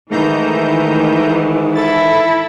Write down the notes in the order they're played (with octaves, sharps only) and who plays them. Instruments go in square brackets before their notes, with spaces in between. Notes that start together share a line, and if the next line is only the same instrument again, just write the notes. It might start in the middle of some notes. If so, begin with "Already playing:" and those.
[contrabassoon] G#2 [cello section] D#3 E3 [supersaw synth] A3 A#5 G6
[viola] E4 [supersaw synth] A4 A6